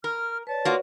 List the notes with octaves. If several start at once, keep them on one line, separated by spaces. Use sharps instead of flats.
A#4 F6
B4 C#5 D5 A5
A#3 F4 F#4